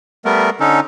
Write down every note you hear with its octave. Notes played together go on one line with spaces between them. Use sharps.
G3 A3 B3 A#4
D3 C#4 D#4 A4